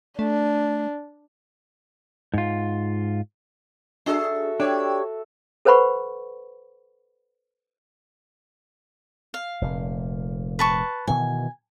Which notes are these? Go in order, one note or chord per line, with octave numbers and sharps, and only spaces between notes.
A3 D4
G#2 F4
D4 F#4 G#4 A4 E5
D4 G4 C#5
A4 B4 C5 F#5 B5 C#6
F5
F1 A#2
B4 A5 C#6
B2 D#3 E3 G#5